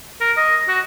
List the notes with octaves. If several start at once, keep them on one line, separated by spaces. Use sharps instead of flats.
A#4
D#5
F#4